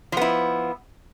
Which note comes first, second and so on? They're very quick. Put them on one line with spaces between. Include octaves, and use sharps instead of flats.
F3 B3 E4